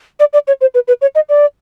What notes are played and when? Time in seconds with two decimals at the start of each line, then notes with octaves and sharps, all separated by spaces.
0.20 D5
0.33 D5
0.48 C#5
0.61 C5
0.74 B4
0.88 B4
1.02 C#5
1.15 D#5
1.29 D5